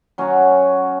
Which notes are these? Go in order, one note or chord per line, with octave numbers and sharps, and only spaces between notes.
F#3 C#4 F#4 C#5